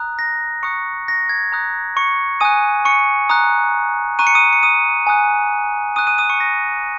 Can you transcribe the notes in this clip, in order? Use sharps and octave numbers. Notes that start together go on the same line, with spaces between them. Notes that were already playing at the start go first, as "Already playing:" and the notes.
Already playing: A#5 D#6 F#6
A#6
A#5 C#6 D#6 F#6 C#7
A#6
G#6
A#5 D#6 F#6
C#6 C#7
G#5 D#6 F#6 D#7
C#6 C#7
A#5 D#6 F#6
A#5 C#6 F#6 D#7
C#7
D#6 D#7
C#7
D#6 D#7
G#5 D#6 F#6
G#5 C#6 D#6 F#6 D#7
D#6 D#7
D#6 D#7
C#6 C#7
A#6